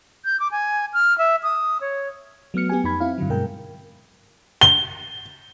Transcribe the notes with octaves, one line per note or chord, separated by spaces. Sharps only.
G6
D6
G#5
F6
E5
D#6
C#5
F#3 A3 B3 F6 C#7
B3 G4 G#5
F2 D#4 B5 G#6
C4 E4 F5
G2 D3 F#3
G2 B2 G#3 A#4 G5
G7